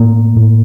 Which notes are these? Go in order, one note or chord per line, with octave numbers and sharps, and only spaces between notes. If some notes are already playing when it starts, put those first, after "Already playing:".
Already playing: A2 A#3
A2